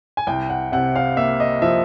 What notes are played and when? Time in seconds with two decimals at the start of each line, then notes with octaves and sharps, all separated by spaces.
0.17 G#5
0.27 C2 G5
0.50 F#5
0.72 C3 F#5
0.96 F5
1.17 A#3 E5
1.40 D#5
1.62 F3 E5